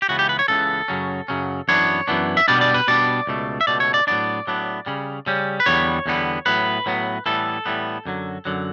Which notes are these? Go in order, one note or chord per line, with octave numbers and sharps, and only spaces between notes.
G4
C#2 C#3 E3 B3 F#4
G4
B4
C#5
C#2 C#3 E3 B3 A4
F#2 C#3 F#3 C#4
F#2 C#3 F#3 C#4
F#2 E3 B3 D4 C#5
F#2 E3 B3 D4
E5
B2 G3 B3 D4 D5
D5
B4
B2 G3 B3 D4 D5
C#2 B2 A3
E5
C#2 B2 A3 D5
C#5
D5
A2 F#3 B3 D4 D5
A2 F#3 B3 D4
C#3 G3 C#4
C#3 G3 C#4
B4
E2 D3 G3 B3 C#5
E2 D3 G3 B3
A2 F#3 B3 B4
A2 F#3 B3
A2 E3 G3 B3 A4
A2 E3 G3 B3
F#2 D3 F#3
F#2 D3 F#3